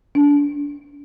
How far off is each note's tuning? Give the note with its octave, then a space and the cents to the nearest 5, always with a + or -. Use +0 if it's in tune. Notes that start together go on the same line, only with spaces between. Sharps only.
D4 -30